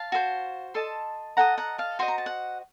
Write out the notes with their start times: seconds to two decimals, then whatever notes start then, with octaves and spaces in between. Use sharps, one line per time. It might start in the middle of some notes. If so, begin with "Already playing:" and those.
Already playing: F5 A5
0.12 F#4 A4 C5
0.74 A4 D#5 A5 C6
1.37 A4 C5 D#5 F#5 A#5
1.58 F#5 A#5
1.78 F5 A5
1.99 F#4 C5 D#5 C6
2.08 A#5
2.18 A5
2.26 F#5